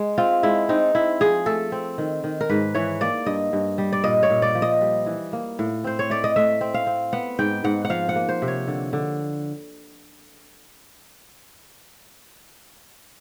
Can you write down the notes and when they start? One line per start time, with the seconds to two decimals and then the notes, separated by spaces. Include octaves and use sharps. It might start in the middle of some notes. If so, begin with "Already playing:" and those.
Already playing: G#3
0.18 C4 F4
0.43 G#3 E4
0.69 C4 D#4
0.95 C4 E4
1.20 F3 G#4
1.46 A3 A4
1.72 C4
1.98 D#3
2.24 D#3
2.41 A#4
2.49 G#2 B4
2.74 E3 C#5
3.01 A#3 D5
3.26 G2 D#5
3.53 G2
3.78 G3
3.93 D5
4.04 A#2 D#5
4.23 C#5
4.30 A#2
4.42 D5
4.55 F3
4.62 D#5
4.81 G3
5.06 E3
5.33 A#3
5.59 A2
5.84 C4 C5
5.99 C#5
6.10 A3 D5
6.24 D#5
6.36 A3 E5
6.61 C4
6.74 F5
6.87 C4
7.13 B3 F#5
7.39 G#2 G5
7.64 G#2 F#5
7.85 F#5
7.90 F3 F5
8.09 F#5
8.16 A#3
8.29 C5
8.42 C3
8.48 C#5
8.67 D3
8.93 D3